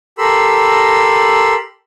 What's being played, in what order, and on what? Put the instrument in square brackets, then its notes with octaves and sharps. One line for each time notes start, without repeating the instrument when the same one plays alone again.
[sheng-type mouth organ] G4 A4 A#4 B5 C6 E6